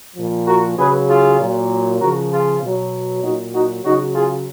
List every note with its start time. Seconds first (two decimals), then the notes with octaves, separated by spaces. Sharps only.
0.16 A#2 F3
0.46 F#4 A#4
0.77 C#3 F#3 G#4 B4
1.07 F4 G#4
1.39 A#2 F#3
1.99 C#3 F3 F#4 A#4
2.30 F4 G#4
2.61 B2 F#3
3.22 A#2 F#3 D#4 F#4
3.53 D#4 F#4
3.83 C#3 F#3 D#4 F#4
4.14 F4 G#4